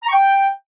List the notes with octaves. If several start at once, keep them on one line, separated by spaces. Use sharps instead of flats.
A#5
C#6
G5